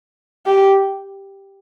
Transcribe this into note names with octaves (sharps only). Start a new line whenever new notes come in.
G4